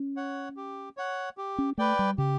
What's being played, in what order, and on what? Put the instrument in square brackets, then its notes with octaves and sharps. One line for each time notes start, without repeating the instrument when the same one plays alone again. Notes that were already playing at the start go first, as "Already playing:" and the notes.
Already playing: [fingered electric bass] C#4
[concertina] C#5 F#5
G4
C#5 F#5
G4
[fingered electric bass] C#4
[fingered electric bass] A3 [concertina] B4 D5 G5
[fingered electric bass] G3
[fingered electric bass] C#3 [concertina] G4